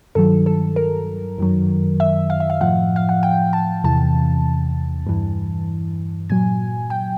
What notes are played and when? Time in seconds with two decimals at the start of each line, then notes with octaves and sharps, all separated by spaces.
0.15 G2 D#3 F#3 A4
0.46 A4
0.76 A#4
1.38 F#2 D#3 F#3
2.00 E5
2.30 F5
2.40 E5
2.50 F5
2.61 A2 F3 F#5
2.96 F5
3.09 F#5
3.23 G5
3.53 A5
3.84 E2 C3 E3 A5
5.07 G2 E3
6.30 A#2 F#3 G#5
6.90 G5